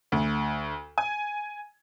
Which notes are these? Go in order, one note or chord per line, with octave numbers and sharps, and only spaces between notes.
D2
G#5